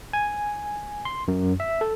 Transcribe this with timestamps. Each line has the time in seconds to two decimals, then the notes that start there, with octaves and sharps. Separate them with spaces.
0.13 G#5
1.05 C6
1.28 F#2
1.60 E5
1.81 A4